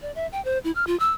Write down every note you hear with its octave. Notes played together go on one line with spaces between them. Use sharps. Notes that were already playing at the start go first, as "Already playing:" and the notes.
D5
E5
G5
C5
E4
F6
F4
E6